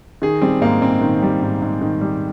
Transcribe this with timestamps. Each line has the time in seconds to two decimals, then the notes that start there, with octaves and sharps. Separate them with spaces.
0.22 D#3 G#4
0.42 G3 C4
0.61 G#2 A#3
0.81 G#2 C4
1.01 D#3
1.22 G3
1.42 G#2
1.62 G#2
1.81 D#3
2.01 G3